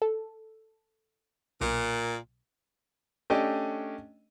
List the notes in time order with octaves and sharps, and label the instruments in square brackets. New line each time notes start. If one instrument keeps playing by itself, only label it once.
[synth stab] A4
[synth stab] B1 [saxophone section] A#2
[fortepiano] A3 C#4 D4 G4 D#5 G5